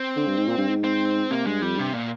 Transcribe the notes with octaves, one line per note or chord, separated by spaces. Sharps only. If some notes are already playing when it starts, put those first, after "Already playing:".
Already playing: C4
D3
G2
G#2
A#2
G2
G#2
C4
C3 A#3
G2 G#3
F2 G3
G2 C3
A#2